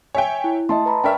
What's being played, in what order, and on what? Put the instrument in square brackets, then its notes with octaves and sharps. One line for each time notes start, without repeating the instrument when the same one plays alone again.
[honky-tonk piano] C#5 E5 G5 [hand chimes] G#5
[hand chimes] E4
[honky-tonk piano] A3 [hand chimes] D#5 A5 C6
[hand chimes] B4 A#5 B5
[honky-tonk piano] D4 A#4 E5 [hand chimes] G5 C#6 F6